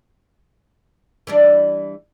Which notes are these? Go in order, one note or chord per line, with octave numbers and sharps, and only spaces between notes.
E3 G3 D4